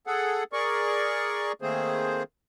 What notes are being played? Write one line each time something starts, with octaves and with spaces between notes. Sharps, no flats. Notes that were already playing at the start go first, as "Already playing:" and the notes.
G#4 A4 F#5
G#4 A#4 D5 C#6
D#3 A3 A#3 C4 G#4 C5